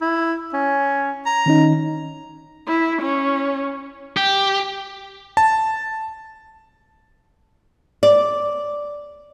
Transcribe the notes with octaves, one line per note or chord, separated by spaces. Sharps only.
E4
C#4
A#5
D#3 C#4 D#4
E4
C#4
G4
A5
D5